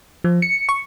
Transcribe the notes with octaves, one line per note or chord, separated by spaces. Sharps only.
F3
C#7
C#6